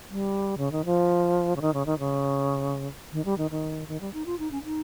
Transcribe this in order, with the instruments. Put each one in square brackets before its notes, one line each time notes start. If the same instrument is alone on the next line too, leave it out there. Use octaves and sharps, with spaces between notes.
[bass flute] G3
C#3
D#3
F3
C#3
D#3
C#3
D#3
C#3
D#3
G3
D#3
D#3
D#3
G3
D#4
F4
D#4
C#4
D#4